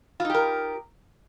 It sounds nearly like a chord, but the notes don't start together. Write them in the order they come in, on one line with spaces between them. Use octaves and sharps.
F4 D#4 G4 A#4